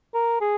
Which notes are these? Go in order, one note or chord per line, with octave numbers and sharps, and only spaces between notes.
A#4
G#4